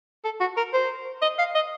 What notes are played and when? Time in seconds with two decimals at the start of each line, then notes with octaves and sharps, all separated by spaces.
0.24 A4
0.40 F#4
0.57 A#4
0.73 C5
1.22 D#5
1.38 F5
1.55 D#5